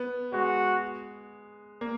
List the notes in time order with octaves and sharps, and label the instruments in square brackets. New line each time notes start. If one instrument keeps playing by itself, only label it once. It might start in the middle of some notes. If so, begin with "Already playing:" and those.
Already playing: [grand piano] B3
[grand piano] G#3 [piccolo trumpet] F#4
[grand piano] A#3